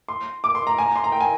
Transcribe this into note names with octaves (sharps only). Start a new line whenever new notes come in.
C6
D6
C6
A#5
G#5
A#5
C6
A#5
G5
G#5